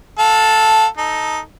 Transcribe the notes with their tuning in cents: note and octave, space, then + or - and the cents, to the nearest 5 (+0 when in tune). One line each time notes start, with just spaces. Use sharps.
A4 +0 F5 +35
D#4 +0 A4 -10